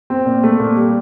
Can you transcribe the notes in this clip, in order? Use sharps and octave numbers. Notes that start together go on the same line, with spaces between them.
C4
A#2
A3
A#2
G3